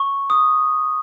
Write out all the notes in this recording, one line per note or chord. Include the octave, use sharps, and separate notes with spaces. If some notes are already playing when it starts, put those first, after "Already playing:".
Already playing: C#6
D#6